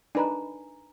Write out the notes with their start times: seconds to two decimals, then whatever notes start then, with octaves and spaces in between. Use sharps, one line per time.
0.15 D4 D#4 B4 G#5 A#5